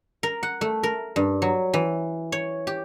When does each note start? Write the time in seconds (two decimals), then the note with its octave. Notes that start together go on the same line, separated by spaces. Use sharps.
0.23 A#4
0.43 F#5
0.61 A3
0.83 A#4
1.16 G2
1.42 F#3
1.74 E3
2.32 C#5
2.67 G4